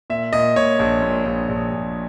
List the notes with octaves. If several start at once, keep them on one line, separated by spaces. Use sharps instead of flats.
A#2 E5
A#2 D#5
A#2 C#5
A#1
A#2
A#1
A#1
A#1